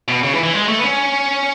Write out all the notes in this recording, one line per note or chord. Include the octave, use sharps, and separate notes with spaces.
B2
C#3
E3
E3
G#3
A3
B3
C#4